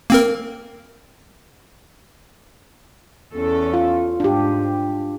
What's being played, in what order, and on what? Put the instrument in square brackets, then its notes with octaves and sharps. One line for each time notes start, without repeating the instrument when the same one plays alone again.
[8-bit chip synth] A#3 C4 A#4
[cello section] E2 C#4 A4
[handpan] F4
[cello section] G#2 [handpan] D4 G4